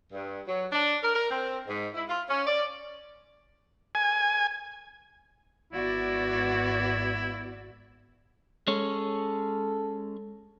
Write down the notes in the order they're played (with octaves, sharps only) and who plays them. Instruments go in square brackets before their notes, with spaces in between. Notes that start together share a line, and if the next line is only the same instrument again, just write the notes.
[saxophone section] G2
F#3
D4
A#4
A#4
C4
G#2
E4
F4
C#4
D5
[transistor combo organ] G#5
[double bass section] G#1 [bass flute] B3 [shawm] E4 [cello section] F#4 D5
[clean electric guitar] G#3 C#4 C#5 [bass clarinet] A4